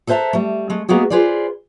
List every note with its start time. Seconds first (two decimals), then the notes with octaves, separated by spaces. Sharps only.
0.07 A4 B4 C5 E5 A5 A#5
0.33 G3 A3
0.70 G#3 A3
0.89 G#3 A#3 B3 F#4 G#4
1.10 F4 G#4 B4 C5 D5